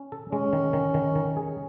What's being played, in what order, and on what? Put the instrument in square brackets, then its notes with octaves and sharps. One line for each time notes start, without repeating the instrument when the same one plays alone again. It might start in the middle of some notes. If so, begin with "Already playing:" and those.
Already playing: [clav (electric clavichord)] C#4
A4
[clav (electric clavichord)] G#3 [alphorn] C#4
[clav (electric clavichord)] D#3
D#3
D#3
D#3
G#4